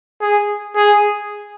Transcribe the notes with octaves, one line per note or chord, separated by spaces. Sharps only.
G#4
G#4